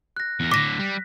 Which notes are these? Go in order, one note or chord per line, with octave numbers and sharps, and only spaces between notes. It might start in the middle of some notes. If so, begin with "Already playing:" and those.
F#6 A#6
E2 A#4
A2 D3 D6 A#6 B6
G3